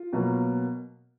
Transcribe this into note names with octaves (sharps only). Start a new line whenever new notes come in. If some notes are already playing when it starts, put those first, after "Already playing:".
Already playing: F4
B2 F#3 A#3